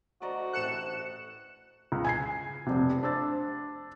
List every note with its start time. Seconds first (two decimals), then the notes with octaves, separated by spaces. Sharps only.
0.22 D2 A3 F#4 C5 D5 D#5 A#5
0.53 A1 A4 F#6 C#7 E7
1.92 C#2
2.05 G#5 G#6 C7
2.66 F1 C3
3.03 D4 C5 E6 A6